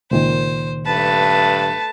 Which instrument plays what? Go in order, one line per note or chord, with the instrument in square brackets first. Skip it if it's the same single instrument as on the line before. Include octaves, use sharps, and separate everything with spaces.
[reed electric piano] C#2 A#2 D#3 [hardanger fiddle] C5
[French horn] G2 [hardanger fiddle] A3 B4 [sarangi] A5